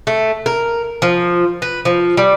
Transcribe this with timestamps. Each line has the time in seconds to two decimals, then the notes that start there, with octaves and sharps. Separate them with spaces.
0.07 A3
0.46 A#4
1.02 F3
1.62 B4
1.85 F3
2.17 G3